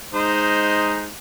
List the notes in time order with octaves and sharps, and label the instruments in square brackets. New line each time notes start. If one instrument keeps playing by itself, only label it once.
[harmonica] G#3 D#4 C5